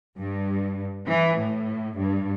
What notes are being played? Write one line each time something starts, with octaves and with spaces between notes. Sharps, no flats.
G2
E3
A2
G2